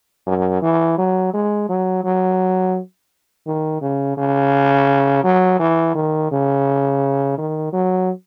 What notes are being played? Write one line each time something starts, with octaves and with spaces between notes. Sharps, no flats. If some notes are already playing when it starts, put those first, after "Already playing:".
F#2
E3
F#3
G#3
F#3
F#3
D#3
C#3
C#3
F#3
E3
D#3
C#3
D#3
F#3